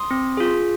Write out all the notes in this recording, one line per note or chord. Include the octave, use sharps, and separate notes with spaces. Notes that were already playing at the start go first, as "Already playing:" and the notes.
Already playing: C6 D#6
C4
F4 G#4